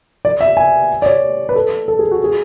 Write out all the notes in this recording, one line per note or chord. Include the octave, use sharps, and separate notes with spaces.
D5
E5
G#5
D5
C#5
B4
A4
A4
G#4
F#4
G#4